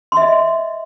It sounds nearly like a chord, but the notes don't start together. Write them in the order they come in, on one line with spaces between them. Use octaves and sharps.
C6 E5 D#5